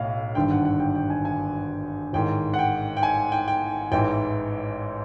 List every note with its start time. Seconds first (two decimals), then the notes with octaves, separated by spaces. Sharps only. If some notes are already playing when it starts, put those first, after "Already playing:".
Already playing: B1 A2 F5
0.35 G#1 G2 D3 G5
0.51 F#5
0.65 F#5
0.80 G5
0.95 G5
1.10 G#5
1.25 G#5
2.13 A1 G#2 D#3 G5
2.54 F#5
2.59 G5
2.97 G5
3.03 G#5
3.32 G5
3.48 G5
3.92 A1 G#2 E3 G5